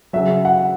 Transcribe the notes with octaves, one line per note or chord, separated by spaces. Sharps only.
C#3 F#3 E5
F#5